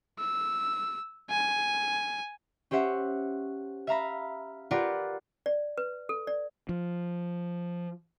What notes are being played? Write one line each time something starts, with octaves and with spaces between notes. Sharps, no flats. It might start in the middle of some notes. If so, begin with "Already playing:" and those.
E6
G#5
C#4 G4 C5 E5 F#5
E5 F5 A#5 B5
F4 G4 A#4 B4 D5 F#5
D5
B4
A4
D5
F3